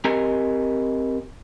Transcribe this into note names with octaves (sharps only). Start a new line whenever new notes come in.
C4 G4 A#4 D#5 G#5 A#5